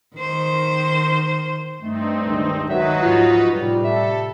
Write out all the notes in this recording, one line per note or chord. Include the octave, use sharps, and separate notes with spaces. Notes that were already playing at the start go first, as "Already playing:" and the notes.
D#3 C5
G2 A3 C4 D#4
C#2 D#3
D#3 F#3 D#4 F#4 B4 E5
G#2 F3 F4
A2 C3 G3 F4
A4 E5